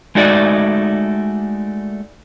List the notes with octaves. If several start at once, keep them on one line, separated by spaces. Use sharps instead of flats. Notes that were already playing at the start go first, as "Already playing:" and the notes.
G#3 A3 D#4 F#4 D5